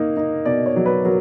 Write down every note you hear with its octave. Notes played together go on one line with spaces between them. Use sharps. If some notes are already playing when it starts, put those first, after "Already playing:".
Already playing: A#3 D#4
D#4
B2 D5
C#5
F#3
B4
F#3 A#4